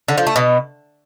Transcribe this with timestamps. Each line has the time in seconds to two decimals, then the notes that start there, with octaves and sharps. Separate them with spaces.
0.08 D3
0.18 F3
0.27 A3
0.36 B2